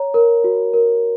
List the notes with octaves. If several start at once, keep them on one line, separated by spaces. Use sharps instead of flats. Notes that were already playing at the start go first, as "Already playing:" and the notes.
Already playing: C#5 A#5
A#4
F#4
A#4